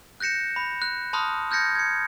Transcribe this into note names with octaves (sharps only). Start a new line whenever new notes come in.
F#6 G6 A#6 C#7 E7
B5
F#6
A5 B5 C6 D#6 F6 F#6
F6 G6 G#6 A#6 C#7
G#6 C#7